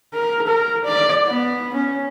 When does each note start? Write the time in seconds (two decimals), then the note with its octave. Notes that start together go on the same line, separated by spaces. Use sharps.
0.14 A#4
0.47 A#4
0.86 D5
1.27 B3
1.74 C#4